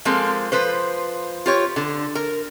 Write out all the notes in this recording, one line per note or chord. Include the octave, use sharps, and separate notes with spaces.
F3 G#3 A#3 C4 A4
F3 B4 C5
F4 G4 C#5
D3
A#4